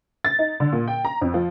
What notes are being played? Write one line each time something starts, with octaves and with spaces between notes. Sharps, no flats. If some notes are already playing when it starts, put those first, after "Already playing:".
A6
D#4
D3
A#2
G5
A#5
F2
F3